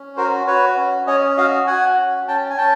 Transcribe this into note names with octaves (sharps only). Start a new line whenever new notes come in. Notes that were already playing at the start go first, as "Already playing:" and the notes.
Already playing: C#4
F#4 A#4 C5
F#4 B4 C#5
C#4
C#4 C#5 D#5
F#4 D#5 F5
F#4 F#5 G#5
C#4
C#4 G5 A5
G#5
C#4 G5 A5